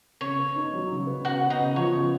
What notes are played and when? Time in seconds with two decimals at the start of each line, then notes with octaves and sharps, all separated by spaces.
0.21 C#3 C#5
0.38 B3
0.56 D#4
0.73 F#3
0.90 C#3
1.07 B3
1.25 C#3 F#4 F#5
1.42 B3
1.50 D#4 D#5
1.59 C#3
1.76 F3 C#5
1.94 C#3